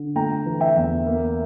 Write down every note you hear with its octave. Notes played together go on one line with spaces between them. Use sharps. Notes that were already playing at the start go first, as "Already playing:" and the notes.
Already playing: D3
A3 G5 A#5
E3
E5 G5
E2
A#3